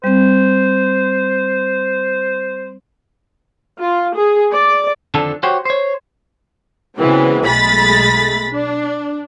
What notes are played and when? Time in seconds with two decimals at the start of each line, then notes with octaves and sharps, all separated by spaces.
0.04 G3 C4 C5
3.80 F4
4.16 G#4
4.53 D5
5.14 F2 D3 D#3 F3 D4 A4
5.43 F#4 G4 C5 C#5
5.65 C5 C#5
6.98 C#3 E3 F#3 G#3 B3 C4
7.43 B1 G#3 A3 B5 A6 B6
8.52 D4